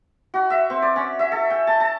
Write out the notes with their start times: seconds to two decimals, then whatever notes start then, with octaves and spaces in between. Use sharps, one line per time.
0.34 F#4
0.50 E5
0.70 C4
0.82 D5
0.96 C#4
1.19 E5
1.32 A4
1.50 G5
1.67 A5
1.80 A5